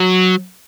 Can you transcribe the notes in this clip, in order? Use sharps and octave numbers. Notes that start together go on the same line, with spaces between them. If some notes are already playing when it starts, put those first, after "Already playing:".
Already playing: F#3